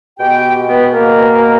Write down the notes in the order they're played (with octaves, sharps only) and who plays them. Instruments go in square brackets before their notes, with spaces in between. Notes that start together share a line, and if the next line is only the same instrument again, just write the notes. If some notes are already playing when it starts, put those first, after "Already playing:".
[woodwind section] B2 G#3 B3 G4 G5
B3 B4
A#3 A#4